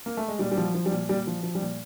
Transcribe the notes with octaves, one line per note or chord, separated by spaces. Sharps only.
A#3
A3
G#3
A#2 G3
G3
F3
F#3
F3
G3
A#2
A#2 G3
F3
F3
G3
A#2